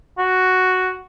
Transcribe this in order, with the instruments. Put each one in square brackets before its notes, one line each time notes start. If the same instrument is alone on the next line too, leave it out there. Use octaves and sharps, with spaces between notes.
[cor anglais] F#4